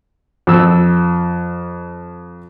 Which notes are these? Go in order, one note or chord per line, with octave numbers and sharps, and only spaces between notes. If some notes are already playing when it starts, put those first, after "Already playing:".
F2 E6